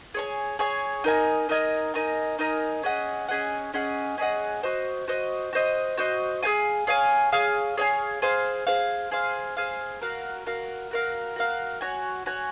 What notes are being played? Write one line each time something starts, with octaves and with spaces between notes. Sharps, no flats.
G#4 C#5 G#5
G#4 C#5 G#5
D#4 A#4 D#5 G#5
D#4 A#4 D#5 G#5
D#4 A#4 D#5 G#5
D#4 A#4 D#5 G#5
C#4 G#4 D#5 F#5
C#4 G#4 D#5 F#5
C#4 G#4 D#5 F#5
C#4 G#4 D#5 F#5
F#4 C5 D#5
F#4 C5 D#5
F#4 C5 D#5
F#4 C5 D#5
G#4 C#5 F5 G#5
G#4 C#5 F5 G#5
G#4 C#5 F5 G#5
G#4 C#5 F5 G#5
G#4 C5 F5
G#4 C5 F5
G#4 C5 F5
G#4 C5 F5
F#4 A#4 F5
F#4 A#4 F5
F#4 A#4 F5
F#4 A#4 F5
F#4 C#5 G#5
F#4 C#5 G#5